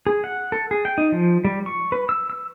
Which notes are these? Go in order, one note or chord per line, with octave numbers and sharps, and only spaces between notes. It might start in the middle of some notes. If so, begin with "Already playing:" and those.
G#4
F#5
A4
G#4
G5
D#4
F3
G3
C#6
B4
E6
E6